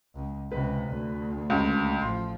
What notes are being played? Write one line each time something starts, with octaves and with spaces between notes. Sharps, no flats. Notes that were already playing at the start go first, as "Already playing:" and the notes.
C#2
C#2 C3 B4
D2
C#2
A1 F3 C6